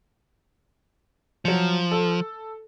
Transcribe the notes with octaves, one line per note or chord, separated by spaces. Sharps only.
F3 F#3 C#7
A4